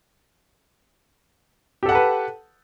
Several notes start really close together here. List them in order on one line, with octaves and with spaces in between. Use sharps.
G4 A4 F#5 A5 B4